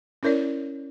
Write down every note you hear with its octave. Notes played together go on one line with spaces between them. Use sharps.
C#4 E4 A#4 C#5 D5